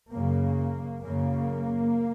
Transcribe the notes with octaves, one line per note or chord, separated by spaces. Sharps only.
F#2 C#3 A#3
F#2 C#3 A#3